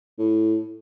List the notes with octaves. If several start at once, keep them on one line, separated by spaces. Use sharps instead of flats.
A2